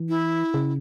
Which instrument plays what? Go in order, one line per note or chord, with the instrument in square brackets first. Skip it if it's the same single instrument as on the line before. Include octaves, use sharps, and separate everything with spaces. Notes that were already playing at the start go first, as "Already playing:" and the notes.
Already playing: [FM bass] E3
[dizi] E4
[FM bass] C#3